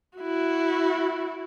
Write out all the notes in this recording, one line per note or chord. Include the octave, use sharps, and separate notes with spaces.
E4 F#4